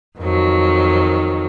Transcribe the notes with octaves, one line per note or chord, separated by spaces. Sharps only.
F2 D#3 F#3